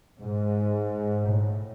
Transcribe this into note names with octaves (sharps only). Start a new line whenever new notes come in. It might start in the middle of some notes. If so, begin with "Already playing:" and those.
G#2
A2